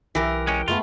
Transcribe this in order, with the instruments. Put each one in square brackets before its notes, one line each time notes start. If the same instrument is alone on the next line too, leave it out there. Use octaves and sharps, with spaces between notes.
[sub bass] B1 [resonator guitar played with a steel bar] E3 A#4 [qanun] G4
[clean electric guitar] G#3 C#4 [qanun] G5
[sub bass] F#2 [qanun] G#3 A3 B3 [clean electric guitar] F4